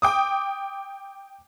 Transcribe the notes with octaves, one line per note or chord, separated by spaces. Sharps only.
G5 D6 D#6